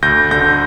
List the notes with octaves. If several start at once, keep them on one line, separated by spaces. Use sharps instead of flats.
D2 G6 A#6
D3 G6 A#6